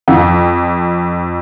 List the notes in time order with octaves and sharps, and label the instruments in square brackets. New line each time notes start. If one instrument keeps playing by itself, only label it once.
[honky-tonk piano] F2